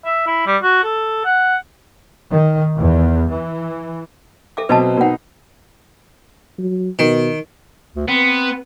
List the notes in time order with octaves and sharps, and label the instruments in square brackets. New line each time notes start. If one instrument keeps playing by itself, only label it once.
[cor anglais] E5
E4
G3
F#4
A4
F#5
[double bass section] D#3
E2
E3
[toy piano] A4 E5 D6
[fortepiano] B2 F#3 C4 [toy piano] B4 D#5 A5
[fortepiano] B2 B3 D#4 [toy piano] A#4 F#5
[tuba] F#3
[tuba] B2 [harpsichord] D#3
[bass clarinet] D2
[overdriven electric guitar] B3 [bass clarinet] C4